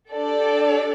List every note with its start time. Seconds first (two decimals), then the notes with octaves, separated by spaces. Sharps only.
0.11 D4 G4 A4 D5